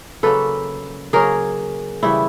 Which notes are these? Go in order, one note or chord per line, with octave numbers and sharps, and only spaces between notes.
C#3 F#3 A#3 C#4 A4 B4
C#3 F#3 A#3 C#4 G#4 A#4
C#3 E3 G3 E4